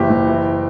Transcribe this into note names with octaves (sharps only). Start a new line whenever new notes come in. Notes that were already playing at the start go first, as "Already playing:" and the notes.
Already playing: F#1 E3 G4
F#1
E3